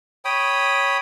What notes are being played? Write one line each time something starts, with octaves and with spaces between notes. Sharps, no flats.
C#5 G5 B5 D#6